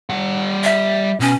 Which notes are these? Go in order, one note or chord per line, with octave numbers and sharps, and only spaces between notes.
G3 F#5
E5
B2 C#4